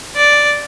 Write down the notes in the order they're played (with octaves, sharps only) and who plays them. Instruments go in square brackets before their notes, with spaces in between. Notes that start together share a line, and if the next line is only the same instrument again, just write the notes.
[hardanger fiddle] D5